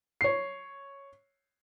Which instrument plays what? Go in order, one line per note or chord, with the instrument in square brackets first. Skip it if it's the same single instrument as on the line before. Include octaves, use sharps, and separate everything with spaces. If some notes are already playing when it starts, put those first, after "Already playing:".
[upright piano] C#5 C7